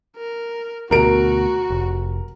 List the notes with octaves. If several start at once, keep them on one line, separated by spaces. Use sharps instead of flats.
A#4
D2 B2 F#4 A#4 D7
F1